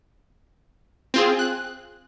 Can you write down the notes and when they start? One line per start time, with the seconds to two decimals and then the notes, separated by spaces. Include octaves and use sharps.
1.14 C4 F4 G#4
1.39 F#6